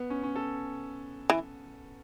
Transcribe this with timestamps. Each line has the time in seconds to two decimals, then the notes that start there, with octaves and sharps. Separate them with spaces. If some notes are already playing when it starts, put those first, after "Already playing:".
Already playing: B3
0.10 C#4
0.23 C#4
0.36 A4
1.30 E3